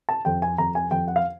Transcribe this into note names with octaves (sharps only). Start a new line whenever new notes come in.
A5
F2 G5
G#5
F2 A#5
G#5
F2 G5
F#5
F5